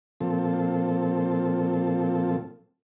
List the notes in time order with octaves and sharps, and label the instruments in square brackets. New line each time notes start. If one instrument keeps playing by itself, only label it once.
[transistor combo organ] A#2 F3 C4 A4